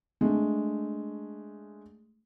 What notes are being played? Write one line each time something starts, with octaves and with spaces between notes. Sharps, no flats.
G#3 A3 D4